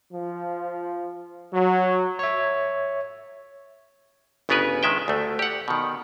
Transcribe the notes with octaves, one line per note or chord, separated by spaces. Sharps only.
F3
F#3
C#5 E5
G1 C#3 B3 A#4 B4 G#5
D#3 G#3 E5 G5
D2 A3
G4 F#5
B2 D#3